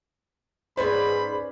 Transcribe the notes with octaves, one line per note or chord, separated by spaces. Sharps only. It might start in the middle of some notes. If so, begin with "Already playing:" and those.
G#2 C#4 B4 C5 D5 B5